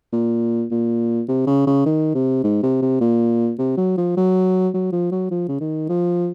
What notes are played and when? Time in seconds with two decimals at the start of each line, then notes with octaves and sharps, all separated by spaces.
0.13 A#2
0.71 A#2
1.29 C3
1.47 C#3
1.67 C#3
1.86 D#3
2.14 C3
2.44 G#2
2.63 C3
2.82 C3
3.01 A#2
3.59 C3
3.77 F#3
3.98 F3
4.17 F#3
4.74 F#3
4.93 F3
5.12 F#3
5.31 F3
5.49 C#3
5.61 D#3
5.89 F3